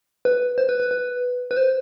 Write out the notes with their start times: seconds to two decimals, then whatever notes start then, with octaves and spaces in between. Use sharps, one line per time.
0.25 B4
0.58 C5
0.69 B4
0.80 B4
0.91 B4
1.51 B4
1.57 C5